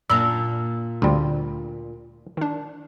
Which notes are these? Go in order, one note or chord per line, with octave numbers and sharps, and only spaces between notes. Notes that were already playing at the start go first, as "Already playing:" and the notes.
F#2 A#2 D4 A#5 B5 E6
D2 G3 C4 F4
D#3 D4